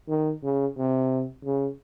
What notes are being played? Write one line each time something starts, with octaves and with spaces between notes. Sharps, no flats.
D#3
C#3
C3
C#3